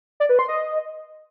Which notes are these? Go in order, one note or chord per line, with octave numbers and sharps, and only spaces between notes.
D5
B4
C6
D#5